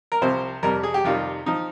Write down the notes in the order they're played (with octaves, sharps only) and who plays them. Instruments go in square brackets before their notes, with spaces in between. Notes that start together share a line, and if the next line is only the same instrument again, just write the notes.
[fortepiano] A#4
C2 C3 F3 C5
F2 C3 G3 A#4
G#4
G4
F2 C3 D#3 G3 F4
F3 D#4